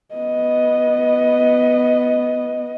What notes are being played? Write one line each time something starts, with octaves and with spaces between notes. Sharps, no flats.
B3 D#5